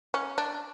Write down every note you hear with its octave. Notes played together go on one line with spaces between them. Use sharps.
C#4
D4